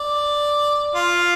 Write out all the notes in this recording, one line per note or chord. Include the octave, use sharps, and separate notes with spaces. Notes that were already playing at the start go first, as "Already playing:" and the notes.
Already playing: D5
F4